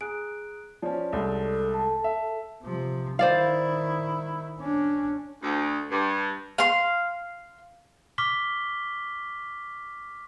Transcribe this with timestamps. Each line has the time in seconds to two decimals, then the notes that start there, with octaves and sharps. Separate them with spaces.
0.01 G#4 A#5 F#6 D7
0.82 F3 C#4 C#5 D5 A5
1.13 C2 G#3 A4
1.74 A5
2.04 E5
2.62 C3 F3
3.19 D#3 E4 C5 D5 F5
4.60 C#4 D4
5.42 D2
5.90 G2
6.58 F5 C6
8.18 C#6 D6 F6 B6 G7